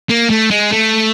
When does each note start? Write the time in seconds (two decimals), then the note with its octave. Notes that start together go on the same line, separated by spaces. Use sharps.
0.09 A#3
0.30 A3
0.51 G#3
0.72 A3